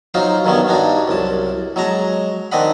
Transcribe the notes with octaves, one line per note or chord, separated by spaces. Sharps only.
F#3 D#4 F4 C5
G2 D#3 F#3 B3 C#4
G2 D4 D#4 F#4
C2 F#2 A5
F#3 G#3 A5 A#5
D#3 C4 D4 D#5 F#5 B5